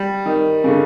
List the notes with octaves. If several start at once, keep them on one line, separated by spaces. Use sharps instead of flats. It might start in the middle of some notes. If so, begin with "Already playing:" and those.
Already playing: G3
D#3
C#3
D3